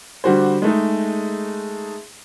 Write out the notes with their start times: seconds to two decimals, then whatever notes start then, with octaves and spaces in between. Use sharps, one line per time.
0.24 D3 G3 F#4 C5
0.62 G#3 A3 D#4